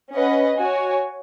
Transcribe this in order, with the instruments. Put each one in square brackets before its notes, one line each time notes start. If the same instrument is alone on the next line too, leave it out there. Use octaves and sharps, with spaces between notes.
[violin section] C#4 B4 D#5 F#5
F#4 C#5 G#5